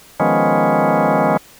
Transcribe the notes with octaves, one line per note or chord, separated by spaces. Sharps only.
D#3 F3 G#3 B3 C#4